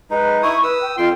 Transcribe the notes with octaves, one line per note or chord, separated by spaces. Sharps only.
G#3 D#4 B4
E4 C#6 D#6
B4 D#6 E6
G5
F2 F4 G5 C6